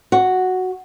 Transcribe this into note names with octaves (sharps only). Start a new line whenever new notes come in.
F#4